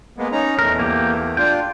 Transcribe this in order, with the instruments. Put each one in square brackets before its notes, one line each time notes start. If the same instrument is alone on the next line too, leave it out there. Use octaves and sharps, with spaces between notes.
[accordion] G#3 A#3 B3
C#4 D#4 A#5
[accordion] E2 A3 [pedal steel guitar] A#4
[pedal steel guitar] A#3 G4
[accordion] D4 F4 [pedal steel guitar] G5